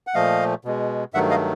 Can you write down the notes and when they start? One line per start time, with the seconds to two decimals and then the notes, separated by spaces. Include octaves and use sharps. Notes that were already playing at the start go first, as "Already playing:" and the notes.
0.07 F#5
0.14 A#2 F3 A3 D#5 F5
0.65 B2 G#3
1.14 G2 D#3 F#3 A3 E5 F#5
1.30 D#5 F5